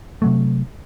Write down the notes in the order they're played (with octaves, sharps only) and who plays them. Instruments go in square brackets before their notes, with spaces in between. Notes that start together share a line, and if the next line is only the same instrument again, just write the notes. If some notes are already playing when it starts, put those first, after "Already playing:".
[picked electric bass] C3 F#3 A3